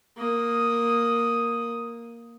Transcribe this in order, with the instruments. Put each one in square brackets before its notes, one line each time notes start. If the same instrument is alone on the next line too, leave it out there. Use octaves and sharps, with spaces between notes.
[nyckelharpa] A#3 D#6